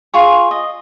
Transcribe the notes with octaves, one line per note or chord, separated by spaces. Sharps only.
F4 G#4 C#6
D#5